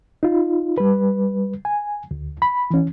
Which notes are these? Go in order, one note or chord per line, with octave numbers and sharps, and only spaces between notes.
D#4 F4
G3 B4
G#5
D2
B5
E3 C#4